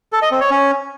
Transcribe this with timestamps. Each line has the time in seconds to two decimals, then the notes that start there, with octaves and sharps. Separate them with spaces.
0.12 A4
0.22 D#5
0.31 C4
0.41 C#5
0.50 C#4